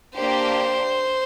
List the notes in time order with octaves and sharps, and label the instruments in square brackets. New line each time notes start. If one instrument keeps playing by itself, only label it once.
[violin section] A#3 D4 G4 [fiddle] C5